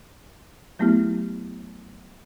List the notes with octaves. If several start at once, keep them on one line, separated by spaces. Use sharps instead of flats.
F#3 A3 B3 E4 G4